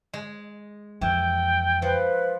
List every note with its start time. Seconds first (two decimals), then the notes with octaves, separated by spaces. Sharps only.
0.14 G#3
1.01 F2 E3 G5
1.82 F3 B4